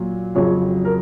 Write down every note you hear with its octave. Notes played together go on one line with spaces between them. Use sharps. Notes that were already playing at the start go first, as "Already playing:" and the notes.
Already playing: A#2 F#3
F2 C#3 F#3 C#5
A#4